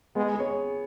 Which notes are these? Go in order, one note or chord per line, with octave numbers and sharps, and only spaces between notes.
G#3 B3
G#4 C#5